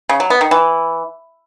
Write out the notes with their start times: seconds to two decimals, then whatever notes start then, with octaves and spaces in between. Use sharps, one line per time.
0.09 C#3
0.20 F#3
0.30 B3
0.41 D#3
0.51 E3